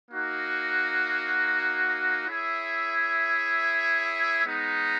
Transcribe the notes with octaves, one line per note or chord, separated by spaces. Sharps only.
A#3 D#4 F#4
E4 G#4 C#5 E5
G#3 B3 D#4